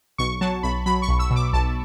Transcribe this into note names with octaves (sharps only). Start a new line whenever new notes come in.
B1 C#6
F#3 A5
B1 B5
F#3 B5
C#6
B1
E6
B2
D6
B1 A5